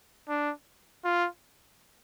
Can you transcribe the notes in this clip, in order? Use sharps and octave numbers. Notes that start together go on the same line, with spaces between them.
D4
F4